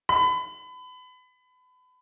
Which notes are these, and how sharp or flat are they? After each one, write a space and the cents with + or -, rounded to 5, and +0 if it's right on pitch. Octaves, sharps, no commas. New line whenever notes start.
B5 +30